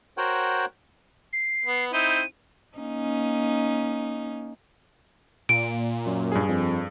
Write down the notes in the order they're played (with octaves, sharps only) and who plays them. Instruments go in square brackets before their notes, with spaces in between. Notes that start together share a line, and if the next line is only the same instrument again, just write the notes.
[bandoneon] F#4 A#4 C5 C#5 F#5 G5
[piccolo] C7
[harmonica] B3
[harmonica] C4 D#4 E4 [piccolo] D#7
[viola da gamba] A#3 C#4 D#4
[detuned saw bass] A#2 [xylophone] D7
[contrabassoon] F#2
[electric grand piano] G2 G#4
[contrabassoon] F2